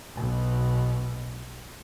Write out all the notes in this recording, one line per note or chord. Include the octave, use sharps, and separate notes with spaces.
B1 B2